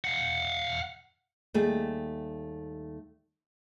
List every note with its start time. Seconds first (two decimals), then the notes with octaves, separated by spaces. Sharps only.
0.04 F5 F#5
1.54 D#2 G3 A3 G#4